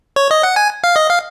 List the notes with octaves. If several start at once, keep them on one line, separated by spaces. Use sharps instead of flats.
C#5
D#5
F#5
G#5
F5
D#5
F5